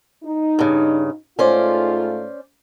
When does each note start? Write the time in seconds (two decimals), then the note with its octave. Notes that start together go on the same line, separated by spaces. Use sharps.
0.24 D#4
0.59 G2 C#3
1.39 G#2 A3 C#4 F4 C5 D5